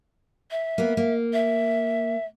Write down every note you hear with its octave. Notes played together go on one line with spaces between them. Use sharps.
E5
A#3 B3
A#3
E5